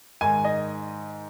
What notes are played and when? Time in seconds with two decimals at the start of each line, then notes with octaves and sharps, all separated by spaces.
0.21 G#2 D#3 G#5
0.45 D#5